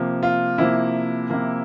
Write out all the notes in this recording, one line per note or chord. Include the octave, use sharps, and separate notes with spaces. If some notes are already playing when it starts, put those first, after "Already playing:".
Already playing: C3 F3 A#3
F4
C3 F3 A#3 E4
C3 F3 A#3